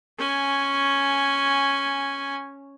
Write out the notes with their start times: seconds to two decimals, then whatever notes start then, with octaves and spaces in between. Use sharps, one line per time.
0.18 C#4 G#5